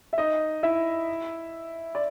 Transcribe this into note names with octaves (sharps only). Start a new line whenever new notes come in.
E5
D#4 D#5
E4 E5
D5